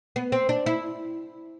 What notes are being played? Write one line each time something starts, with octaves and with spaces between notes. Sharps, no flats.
B3
C4
D4
E4